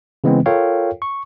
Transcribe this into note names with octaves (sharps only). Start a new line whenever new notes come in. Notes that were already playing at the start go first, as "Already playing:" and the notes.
C#3 E3 G#3 B3 C4
F4 A4 A#4 C#5 F5 G5
C#6